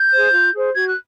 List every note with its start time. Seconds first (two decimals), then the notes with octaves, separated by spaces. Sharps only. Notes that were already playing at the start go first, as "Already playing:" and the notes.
Already playing: G6
0.12 G#4 C5
0.33 F4
0.54 G#4 C5
0.74 F#4 G#6
0.87 F#6